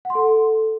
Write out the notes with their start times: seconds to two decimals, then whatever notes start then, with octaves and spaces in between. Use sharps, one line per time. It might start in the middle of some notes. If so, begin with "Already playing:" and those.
0.05 F#5
0.10 C6
0.15 A4